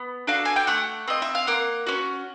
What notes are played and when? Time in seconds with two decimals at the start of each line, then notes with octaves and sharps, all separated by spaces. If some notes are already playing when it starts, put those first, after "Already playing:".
Already playing: B3
0.27 D4 F#4 A4 F5
0.45 G#5
0.56 G5
0.67 A3 F#5
1.08 C4 F4 D#5
1.22 E5
1.35 F5
1.47 A#3 F#5
1.87 C#4 F#4